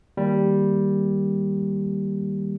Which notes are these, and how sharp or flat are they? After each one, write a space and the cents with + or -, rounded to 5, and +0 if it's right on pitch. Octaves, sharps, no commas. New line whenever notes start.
D#3 +0 G3 +0 A#3 +0